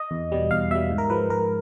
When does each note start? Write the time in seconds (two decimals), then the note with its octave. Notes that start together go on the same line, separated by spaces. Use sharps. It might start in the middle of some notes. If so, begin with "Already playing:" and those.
Already playing: D#5
0.11 E2
0.32 B2 G3
0.51 E2 F5
0.71 B2 G3 E5
0.91 G#2
0.98 A#4
1.10 F3 G#3 B4
1.30 G#2 A#4